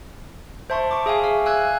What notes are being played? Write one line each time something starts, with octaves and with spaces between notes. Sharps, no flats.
C5 E5 A5 C6 C#6
C#6 D6
G#4 E5 F5 G#5
G#4 F5
G#5 E6 F#6 G#6